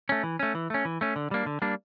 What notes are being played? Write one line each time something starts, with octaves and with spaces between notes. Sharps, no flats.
A3 C#4
E3
A3 C#4
E3
A3 C#4
E3
A3 C#4
D3
G3 A#3 D4
D3
G3 A#3 D4